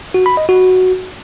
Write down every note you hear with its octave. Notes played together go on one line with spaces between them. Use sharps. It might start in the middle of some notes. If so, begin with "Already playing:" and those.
F#4
B5
D#5
F#4